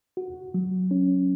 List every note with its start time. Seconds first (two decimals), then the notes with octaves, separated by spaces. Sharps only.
0.17 F#4
0.54 F#3
0.91 C#4